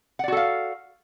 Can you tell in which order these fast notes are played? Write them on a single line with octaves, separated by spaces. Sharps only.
F#5 D5 F#4 A4 F5